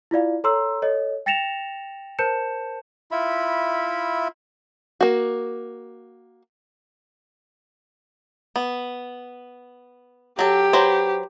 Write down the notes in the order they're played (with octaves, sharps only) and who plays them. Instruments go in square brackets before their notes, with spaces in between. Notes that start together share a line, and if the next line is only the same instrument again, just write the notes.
[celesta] E4 F4 D5 F5
A4 C#5 A#5 C6 E6
A4 C#5 D#5
G5 A6 A#6 C#7 E7 F7
A#4 C5 A5 G6 C#7 E7
[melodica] E4 F4 E5 B5
[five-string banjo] A#3 F#4
B3
[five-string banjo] F#3 A4 [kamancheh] G4
[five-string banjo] F#3 B4 C5